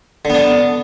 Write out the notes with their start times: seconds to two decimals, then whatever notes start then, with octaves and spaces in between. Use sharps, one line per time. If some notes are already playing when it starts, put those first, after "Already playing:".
0.25 D3
0.30 B3
0.35 D4